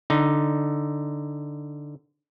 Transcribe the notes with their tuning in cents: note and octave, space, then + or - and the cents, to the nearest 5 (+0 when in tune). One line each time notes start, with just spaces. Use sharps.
D3 +0 D#4 +0